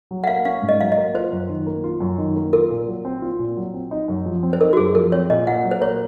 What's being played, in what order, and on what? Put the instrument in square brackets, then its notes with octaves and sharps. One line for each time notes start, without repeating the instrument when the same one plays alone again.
[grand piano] F#3
[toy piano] F#5
[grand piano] A#3 [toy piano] F5
[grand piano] C#4 [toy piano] F5
[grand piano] G#2
[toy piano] D#5
[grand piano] F#3 [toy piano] F5
[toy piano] D#5
[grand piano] A#3
[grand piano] F4 [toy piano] C5
[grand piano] F#2
D#3
A#3
F4
F#2
D#3
A#3
[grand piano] F4 [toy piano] A#4
[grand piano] A#2
F#3
C4
F4
A#2
F#3
C4
D#4
F#2
F3
C4
[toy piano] C5
[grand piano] D#4 [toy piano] A#4
[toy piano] F#4
[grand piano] F#2 [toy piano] G#4
[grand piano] F3 [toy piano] A#4
[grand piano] C4 [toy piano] C#5
[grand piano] A#2 [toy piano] D#5
[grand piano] A#2 [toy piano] F#5
[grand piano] F#3
[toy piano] C5
[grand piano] A#3 [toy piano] C#5